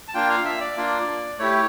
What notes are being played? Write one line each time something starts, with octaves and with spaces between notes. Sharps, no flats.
A5
A#3 D4 F4 G5
F5
E5
D5
A#3 D4 F4
A3 E4 G4 C#5